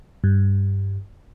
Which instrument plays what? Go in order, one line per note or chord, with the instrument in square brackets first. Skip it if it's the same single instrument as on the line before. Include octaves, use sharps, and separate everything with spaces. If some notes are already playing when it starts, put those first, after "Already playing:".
[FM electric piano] G2